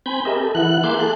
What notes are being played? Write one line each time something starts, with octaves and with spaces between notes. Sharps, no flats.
C4 G#5 B5 G6
G4 G#4 A#4 D#5 E5
A4
E3 E4 F#5 F#6
A#3 G#4 E5 C6 D6 G6
G#4 A4 F#6